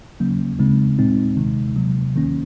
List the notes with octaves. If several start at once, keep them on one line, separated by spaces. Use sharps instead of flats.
C#3 F#3 A#3 C#4
C#3 G#3 C4 D#4
A#2 G#3 C4 D#4
C3 D#3 G#3 D#4
C3 F#3 A#3
D#3 A#3 C#4